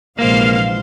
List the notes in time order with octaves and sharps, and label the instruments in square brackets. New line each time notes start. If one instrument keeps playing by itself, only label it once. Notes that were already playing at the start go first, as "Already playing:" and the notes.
[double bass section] A#1 E3 [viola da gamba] C3 G#3 C5 [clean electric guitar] A#3 [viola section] F5